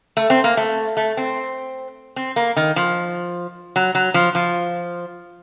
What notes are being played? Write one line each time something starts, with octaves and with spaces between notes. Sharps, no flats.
A3
C4
A#3
A3
A3
C4
C4
A#3
D#3
F3
F#3
F#3
F3
F3